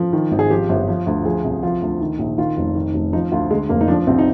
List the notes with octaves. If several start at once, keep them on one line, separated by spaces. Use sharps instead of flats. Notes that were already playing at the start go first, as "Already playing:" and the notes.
Already playing: F3
D#3
G#1
G#4
F3 G4
G1
F3
D2
F3 G#4
C2
F3 F4
D2
D#3
A#1
D#3 F4
F1
D#3
F1
F3 D#4
D2 F4
D3 G#3
F1 A#3
D#4
F3 D4
C2 C4
D#4